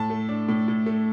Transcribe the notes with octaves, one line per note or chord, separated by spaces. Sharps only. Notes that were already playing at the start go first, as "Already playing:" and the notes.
Already playing: A2 A5
A3
D4
A2
A2
A3